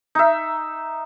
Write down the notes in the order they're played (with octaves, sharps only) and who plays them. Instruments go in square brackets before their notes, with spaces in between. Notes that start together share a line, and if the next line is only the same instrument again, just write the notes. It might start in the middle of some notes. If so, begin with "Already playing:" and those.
[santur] D#4 E5